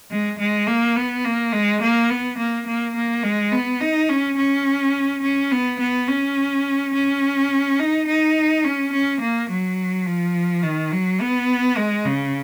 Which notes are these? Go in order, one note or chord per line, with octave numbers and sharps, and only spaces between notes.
G#3
G#3
A#3
B3
A#3
G#3
A#3
B3
A#3
A#3
A#3
G#3
B3
D#4
C#4
C#4
C#4
B3
B3
C#4
C#4
D#4
D#4
C#4
C#4
A#3
F#3
F3
D#3
F#3
B3
G#3
C#3